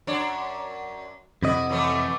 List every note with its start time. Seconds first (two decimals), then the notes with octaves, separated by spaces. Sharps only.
0.07 F#2 D4 C#5
1.43 F2 C3 E4 F#4 D#5
1.69 E3 F#3 A3